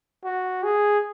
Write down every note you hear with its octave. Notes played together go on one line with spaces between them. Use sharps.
F#4
G#4